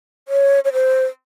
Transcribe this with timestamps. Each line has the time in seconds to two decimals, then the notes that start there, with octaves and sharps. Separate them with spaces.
0.28 C#5
0.65 C#5
0.73 C5